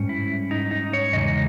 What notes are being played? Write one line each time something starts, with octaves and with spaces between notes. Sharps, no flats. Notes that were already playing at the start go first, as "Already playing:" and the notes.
Already playing: G#2 G3 C#4
E4
D#4
D#4
C#5
E2 C#3 G#3 D#4 D#5